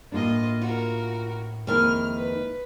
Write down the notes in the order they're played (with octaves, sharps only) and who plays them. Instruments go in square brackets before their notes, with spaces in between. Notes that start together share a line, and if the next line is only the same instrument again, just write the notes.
[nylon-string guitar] A2 A#3 D4 [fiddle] F4 D#5
[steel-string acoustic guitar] F4 [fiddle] F#4 A#4
[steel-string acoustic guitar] F2 D#3 G#3 [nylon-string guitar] A#3 E4 [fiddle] F6
[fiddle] B4